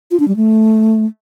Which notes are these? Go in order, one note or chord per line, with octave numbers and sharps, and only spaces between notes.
F4
D4
G3
A3